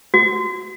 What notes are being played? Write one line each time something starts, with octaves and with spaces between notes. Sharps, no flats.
F#4